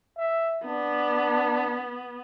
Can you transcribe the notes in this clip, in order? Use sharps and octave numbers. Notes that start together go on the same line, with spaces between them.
E5
B3 D4